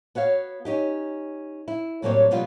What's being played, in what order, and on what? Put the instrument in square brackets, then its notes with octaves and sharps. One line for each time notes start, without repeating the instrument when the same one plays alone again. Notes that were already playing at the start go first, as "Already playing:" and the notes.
[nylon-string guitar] B3 F#4 C#5 F5
C#4 D#4 G4
E4
A2 F#3 G3 A#3 C4 C#5
B2 F#3 G3 B3 F4